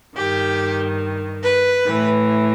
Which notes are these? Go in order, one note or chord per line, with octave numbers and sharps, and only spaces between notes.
G2 D#3 G4
B4
A2 E3